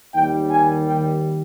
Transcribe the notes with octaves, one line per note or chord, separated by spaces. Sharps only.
D#2 D#3 G3 G5
G#5
G5